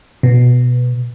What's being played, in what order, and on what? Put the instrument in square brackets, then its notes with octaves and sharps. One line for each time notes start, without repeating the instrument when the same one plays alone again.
[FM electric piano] B2